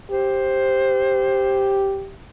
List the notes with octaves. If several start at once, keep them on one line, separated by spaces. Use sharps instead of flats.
G4 C5